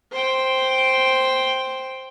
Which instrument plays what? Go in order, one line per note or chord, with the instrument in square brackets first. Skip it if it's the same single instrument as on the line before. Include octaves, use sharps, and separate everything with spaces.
[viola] C5 G5